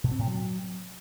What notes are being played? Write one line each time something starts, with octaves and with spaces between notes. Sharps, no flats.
B2
C4
A2
F#3